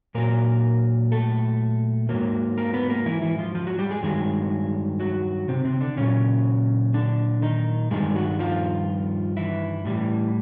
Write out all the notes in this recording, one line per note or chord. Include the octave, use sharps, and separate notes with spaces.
A#2 F#3 A#3 A#4
A3 A4
G#2 D#3 F#3 A#3 A#4
A#3 A#4
B3 B4
A#3 A#4
E3 E4
E3 E4
F3 F4
F3 F4
F#3 F#4
G3 G4
G#3 G#4
G2 D#3 F#3 G#3 G#4
F#3 F#4
C3 C4
C3 C4
D3 D4
A#2 C#3 F#3 C#4
D3 D4
D#3 D#4
G2 D#3 G3 G#3 G#4
F#3 F#4
F3 F4
E3 E4
A2 E3 G3